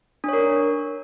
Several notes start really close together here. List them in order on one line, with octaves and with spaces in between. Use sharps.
D4 C#5 A#4